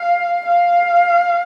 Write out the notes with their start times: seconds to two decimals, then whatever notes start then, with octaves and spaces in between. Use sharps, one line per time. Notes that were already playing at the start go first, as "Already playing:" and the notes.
Already playing: F5
0.46 F5